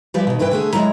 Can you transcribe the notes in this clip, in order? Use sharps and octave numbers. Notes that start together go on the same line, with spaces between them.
E3 F3 G3 D5
B2 D#3
G2 E3 E4 B4 G5
D3 A3 G#4
F#3 G#3 E4 A#5